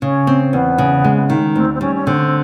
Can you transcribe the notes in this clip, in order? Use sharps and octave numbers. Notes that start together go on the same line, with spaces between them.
C#3 C#4
C4
E2 B3
C#3
G#3
D#3
D2 C4
C4
G3 C#4
C#4
D3 C4